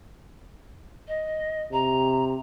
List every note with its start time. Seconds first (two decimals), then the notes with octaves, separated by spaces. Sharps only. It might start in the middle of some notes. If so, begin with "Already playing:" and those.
1.07 D#5
1.72 C3 A#5